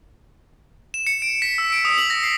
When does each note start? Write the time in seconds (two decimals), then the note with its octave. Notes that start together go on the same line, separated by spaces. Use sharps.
0.94 E7
1.07 C#7
1.22 D7
1.42 B6
1.58 E6
1.72 D7
1.85 D#6
1.98 F#7
2.10 A#6
2.23 C7